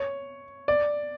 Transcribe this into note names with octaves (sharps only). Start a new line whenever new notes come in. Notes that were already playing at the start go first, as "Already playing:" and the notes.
Already playing: C#5
D5